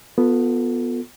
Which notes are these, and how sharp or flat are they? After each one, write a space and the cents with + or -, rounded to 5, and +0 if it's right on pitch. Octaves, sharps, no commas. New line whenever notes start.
B3 +0 F4 +30 A4 +15